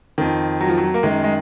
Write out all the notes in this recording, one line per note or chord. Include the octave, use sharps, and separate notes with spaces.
F2 D#3
F#3
F3
F#3
A#3
F#2 D#3 G#3
G#3